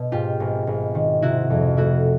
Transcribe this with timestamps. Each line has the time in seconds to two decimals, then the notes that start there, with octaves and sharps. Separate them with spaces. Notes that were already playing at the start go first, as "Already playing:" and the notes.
Already playing: B2
0.12 G#2 F4 G4
0.40 G#1
0.67 G#1
0.95 D#3
1.22 C3 E4 F#4
1.50 F2
1.77 A3 E4 F#4